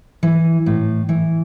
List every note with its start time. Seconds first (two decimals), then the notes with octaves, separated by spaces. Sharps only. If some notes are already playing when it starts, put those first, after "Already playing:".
0.23 E3
0.66 A2
1.09 E3